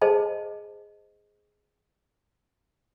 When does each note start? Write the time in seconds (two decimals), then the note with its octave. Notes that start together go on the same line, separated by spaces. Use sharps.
0.02 G#4 C5 D#5 A5